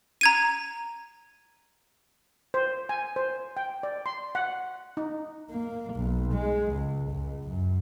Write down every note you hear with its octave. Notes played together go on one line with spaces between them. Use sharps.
A#5 G#6 D#7
C5
G#5
C5
G5
D5
C6
F#5
D#4
A#3
B1
G#3
C#2
C#2
F#2